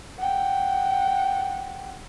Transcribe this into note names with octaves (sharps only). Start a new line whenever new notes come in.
F#5 G5